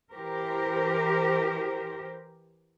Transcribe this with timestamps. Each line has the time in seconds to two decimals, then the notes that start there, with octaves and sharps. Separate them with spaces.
0.12 E3 G4 A#4 C5